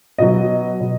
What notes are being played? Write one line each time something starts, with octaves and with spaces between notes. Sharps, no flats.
B2 F#3 D#5
B2